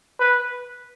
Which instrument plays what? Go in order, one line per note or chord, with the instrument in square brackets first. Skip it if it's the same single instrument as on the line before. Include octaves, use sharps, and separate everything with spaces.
[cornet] B4